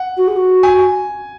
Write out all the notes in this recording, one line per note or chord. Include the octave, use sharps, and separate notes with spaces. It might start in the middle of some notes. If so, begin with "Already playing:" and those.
Already playing: F#5
F#4
G#4
F#4
G#5